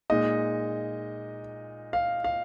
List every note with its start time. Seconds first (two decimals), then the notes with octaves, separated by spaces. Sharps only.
0.10 A#2 G#3 D#4 D#5
1.93 F5
2.24 F5